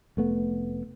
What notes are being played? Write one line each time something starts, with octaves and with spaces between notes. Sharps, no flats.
F1 A3 B3